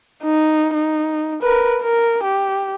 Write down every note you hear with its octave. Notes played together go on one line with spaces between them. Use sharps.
D#4
D#4
A#4 B4
A#4
G4